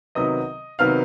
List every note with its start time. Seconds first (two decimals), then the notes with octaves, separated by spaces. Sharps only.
0.15 C3 D#3 F#3 B3 D#5 D#6
0.79 C3 D#3 F#3 B3 F5 F6